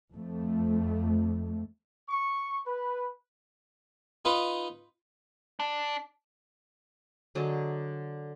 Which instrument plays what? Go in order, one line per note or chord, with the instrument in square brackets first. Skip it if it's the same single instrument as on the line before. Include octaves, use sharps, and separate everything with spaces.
[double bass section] F2 A3
[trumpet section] C#6
B4
[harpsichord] D#4 F4 B4
[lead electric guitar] D4
[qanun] D3 F#3 G#4 D#5